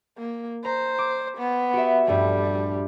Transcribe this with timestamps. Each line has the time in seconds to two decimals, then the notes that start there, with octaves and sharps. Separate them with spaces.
0.18 A#3
0.65 C5 A#5
0.99 D6
1.38 B3
1.73 F#4 G4 E5
2.07 A#1 G2 G3 A3